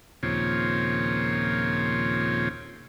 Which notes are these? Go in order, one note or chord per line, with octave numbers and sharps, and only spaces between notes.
D#2 A#2 C#3 F3 C4 C#5